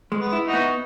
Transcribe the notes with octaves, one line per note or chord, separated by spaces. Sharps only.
G#3
B3
E4
D#4 F#4
B3